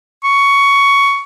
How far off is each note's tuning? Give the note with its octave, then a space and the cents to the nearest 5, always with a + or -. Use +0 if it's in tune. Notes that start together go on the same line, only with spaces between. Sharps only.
C#6 +10